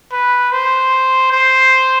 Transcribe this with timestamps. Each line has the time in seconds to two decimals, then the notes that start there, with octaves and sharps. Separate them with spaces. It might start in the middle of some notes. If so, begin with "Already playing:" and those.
0.12 B4
0.52 C5
1.32 C5